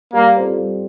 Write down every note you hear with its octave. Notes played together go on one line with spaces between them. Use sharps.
G3 A#3
C4 F4 A4 C5
G3